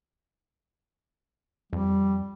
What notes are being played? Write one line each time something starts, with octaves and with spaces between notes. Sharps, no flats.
F2 G3